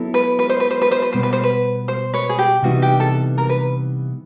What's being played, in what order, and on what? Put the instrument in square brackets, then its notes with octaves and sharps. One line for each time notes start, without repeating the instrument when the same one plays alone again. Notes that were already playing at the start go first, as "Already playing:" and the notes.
Already playing: [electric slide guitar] F#3 B3 E4 A4
[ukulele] B4
B4
C5
B4
C5
B4
C5
B4
[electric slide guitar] B2 G3 B3 [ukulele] C5
[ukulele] B4
C5
B4
C5
B4 C#5
G#4
G4
[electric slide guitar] C3 E3 G3 B3 D#4 [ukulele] F#4
[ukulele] G4
A4
A#4
B4